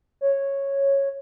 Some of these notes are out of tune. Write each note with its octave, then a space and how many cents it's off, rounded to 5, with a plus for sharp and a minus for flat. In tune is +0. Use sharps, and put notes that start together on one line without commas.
C#5 -10